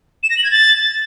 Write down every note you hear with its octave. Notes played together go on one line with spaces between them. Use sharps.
E7
A#6
F#7
G#6
A6